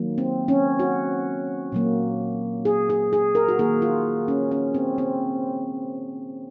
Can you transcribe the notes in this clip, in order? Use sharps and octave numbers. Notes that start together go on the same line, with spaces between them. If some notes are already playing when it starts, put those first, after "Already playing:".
Already playing: D#3 F#3 A#3
C4
C#4
F#4
A#2 F#3 A#3
G#4
G#4
G#4
A#4
F#4
D#3 A#3 G#4
F4
C#4
C#4
C4
C4